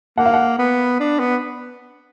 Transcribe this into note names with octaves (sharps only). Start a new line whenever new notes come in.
A#3 F#5
F5
F#5
B3
D4
B3